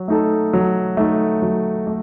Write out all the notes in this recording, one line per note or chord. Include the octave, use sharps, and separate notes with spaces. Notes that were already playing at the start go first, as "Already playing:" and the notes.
Already playing: F#3
A3 D#4 A4
F#3
A3 D#4 A4
F#3
A3